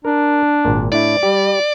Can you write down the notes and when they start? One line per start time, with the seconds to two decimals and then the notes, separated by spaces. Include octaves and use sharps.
0.05 D4 A#4
0.65 G#1 A#2
0.92 A2 D4 E4 D5
1.23 G3 G4